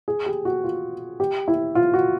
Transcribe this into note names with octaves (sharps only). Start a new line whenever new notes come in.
G#4
G4
F#4
F4
G4
E4
F4
F#4